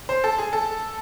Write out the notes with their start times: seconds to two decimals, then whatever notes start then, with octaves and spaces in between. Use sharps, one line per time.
0.09 C5
0.24 A4
0.38 G#4
0.53 A4